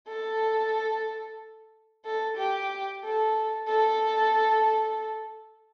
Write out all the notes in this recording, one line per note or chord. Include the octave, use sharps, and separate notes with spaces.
A4
A4
G4
A4
A4